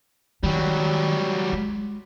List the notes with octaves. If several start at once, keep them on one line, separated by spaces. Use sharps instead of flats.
D#3 F#3 G3
G#3